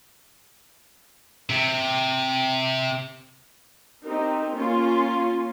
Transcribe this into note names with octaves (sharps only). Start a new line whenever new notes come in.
C3
C4 D#4 G4 A#4
A#3 C#4 F4